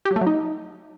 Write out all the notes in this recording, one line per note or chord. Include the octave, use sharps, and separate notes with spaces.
G4
F#3
A3
F#3
D#4